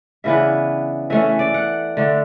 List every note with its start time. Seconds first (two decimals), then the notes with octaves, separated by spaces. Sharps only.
0.24 C#3 E3 B3 D4 E5
1.10 E3 A3 C#4 E5
1.39 D5
1.54 F#5
1.97 D3 A3 D4